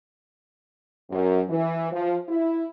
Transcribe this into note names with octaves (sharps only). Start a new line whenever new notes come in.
F#2
E3
F3
E4